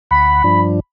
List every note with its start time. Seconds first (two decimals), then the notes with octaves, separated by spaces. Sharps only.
0.11 D2 F#5 B5
0.44 G2 F3 D4